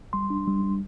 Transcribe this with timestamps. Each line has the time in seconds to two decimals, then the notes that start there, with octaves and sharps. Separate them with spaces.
0.13 G3 C6
0.30 D4
0.48 G3
0.64 D4